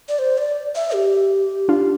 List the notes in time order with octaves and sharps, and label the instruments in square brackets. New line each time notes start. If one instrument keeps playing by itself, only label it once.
[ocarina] D5
C5
D5
E5
G4
[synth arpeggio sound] D4 F4